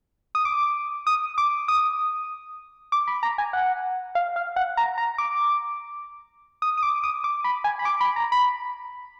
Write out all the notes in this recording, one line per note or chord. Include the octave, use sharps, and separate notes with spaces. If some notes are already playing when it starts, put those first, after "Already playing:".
D#6
D6
D#6
D6
D#6
D6
B5
A#5
G#5
F#5
F5
F5
F#5
A#5
A#5
D6
D#6
D#6
D6
D#6
D6
B5
G#5
B5
D6
B5
A#5
B5